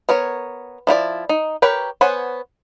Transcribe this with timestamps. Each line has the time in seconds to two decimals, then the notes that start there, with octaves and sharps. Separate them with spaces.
0.09 B3 A#4 C#5
0.87 F3 E4 F4 D5
1.29 D#4
1.62 G4 A#4 B4 C#5 G5
2.01 B3 C5 C#5 F#5 G#5